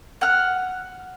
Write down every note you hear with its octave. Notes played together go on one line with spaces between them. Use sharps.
F#5 F6